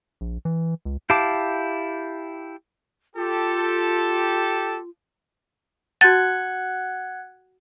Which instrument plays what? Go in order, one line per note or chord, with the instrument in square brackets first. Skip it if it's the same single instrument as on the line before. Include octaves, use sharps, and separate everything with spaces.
[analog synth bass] A#1
E3
C#2
[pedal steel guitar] E4 G4 F5 A5 D6
[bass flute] F4 [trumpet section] G4 A4
[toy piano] F#4 A5 [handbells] F#5 F#6 G#6 [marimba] A6